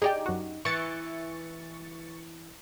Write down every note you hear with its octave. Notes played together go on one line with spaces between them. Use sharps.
D#4 G4 G#4 D5 G5
F#2 F#4
E3 C#6 A6 C#7